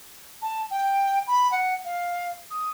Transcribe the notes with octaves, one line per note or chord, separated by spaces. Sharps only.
A5
G5
B5
F#5
F5
D#6